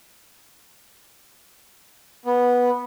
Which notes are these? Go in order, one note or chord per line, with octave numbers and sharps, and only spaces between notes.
B3